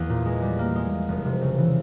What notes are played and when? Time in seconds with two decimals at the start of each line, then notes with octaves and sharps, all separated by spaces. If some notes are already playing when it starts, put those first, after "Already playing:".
Already playing: E2 A#3
0.10 A#2
0.26 G#3
0.42 G3
0.59 A#3
0.75 G#3
0.92 G#3
1.09 F1
1.25 C3
1.41 C#3
1.58 E3